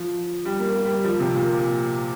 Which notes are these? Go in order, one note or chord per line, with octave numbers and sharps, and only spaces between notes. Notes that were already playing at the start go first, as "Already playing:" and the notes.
Already playing: F3
G3
A#3
A#3
G3
F3
C3
A#2